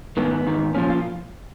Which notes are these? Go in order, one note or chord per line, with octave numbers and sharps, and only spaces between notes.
G#2 D#3 B3
G#2 D#3
A#2 F3 C#4
F4